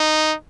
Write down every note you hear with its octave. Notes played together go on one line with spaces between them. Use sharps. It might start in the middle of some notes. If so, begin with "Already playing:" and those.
Already playing: D#4